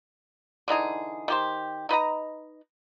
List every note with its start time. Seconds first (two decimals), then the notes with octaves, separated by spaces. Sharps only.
0.68 D3 E3 D#4 G#4
1.28 D#3 G4 C5
1.89 D#4 B4 D#5 A#5